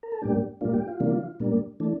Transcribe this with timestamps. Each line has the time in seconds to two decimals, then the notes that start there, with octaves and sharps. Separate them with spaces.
0.03 A#4
0.12 A4
0.22 A2 G3 A#3 D4 G4
0.61 A#2 G3 A#3 D4 F4
0.74 G4
0.88 F4
1.00 C3 E3 G3 A#3 D4
1.40 A#2 G3 A#3 D4
1.80 E3 A3 D4